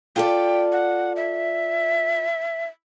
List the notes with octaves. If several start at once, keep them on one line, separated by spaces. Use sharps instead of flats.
F4 A4 D5 G5
F#5
E5